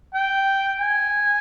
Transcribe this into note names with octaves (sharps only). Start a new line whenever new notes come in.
G5
G#5